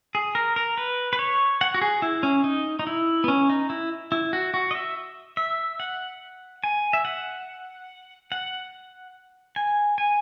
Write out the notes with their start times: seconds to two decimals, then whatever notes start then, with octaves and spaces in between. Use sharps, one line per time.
0.15 G#4
0.35 A#4
0.56 A#4
0.78 B4
1.13 B4
1.19 C#5
1.61 F#5
1.74 F#4
1.81 G#4
2.02 E4
2.23 C#4
2.44 D#4
2.79 D#4
2.87 E4
3.24 B3
3.28 C#4
3.50 D#4
3.70 E4
4.12 E4
4.33 F#4
4.54 F#4
4.71 D#5
4.75 E5
5.37 E5
5.80 F#5
6.64 G#5
6.93 E5
7.05 F#5
8.32 F#5
9.56 G#5
9.98 G#5